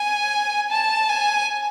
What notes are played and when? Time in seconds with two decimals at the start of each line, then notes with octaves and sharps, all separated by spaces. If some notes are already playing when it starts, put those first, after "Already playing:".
Already playing: G#5
0.72 A5
1.09 G#5